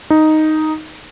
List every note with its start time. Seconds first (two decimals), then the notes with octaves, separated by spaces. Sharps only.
0.10 D#4